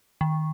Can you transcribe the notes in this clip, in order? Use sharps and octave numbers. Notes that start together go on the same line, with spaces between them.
D#3